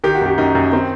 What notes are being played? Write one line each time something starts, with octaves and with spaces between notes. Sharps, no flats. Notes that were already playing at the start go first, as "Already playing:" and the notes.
D#3 G4
F#4
F#2 G4
F#2 D#4
F#2
D#3 C4